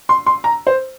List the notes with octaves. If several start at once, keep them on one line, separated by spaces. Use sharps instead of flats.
C6
C6
A#5
C5